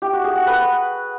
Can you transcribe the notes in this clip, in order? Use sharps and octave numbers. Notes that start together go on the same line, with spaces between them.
G4
F#4
G#4
F#4
B4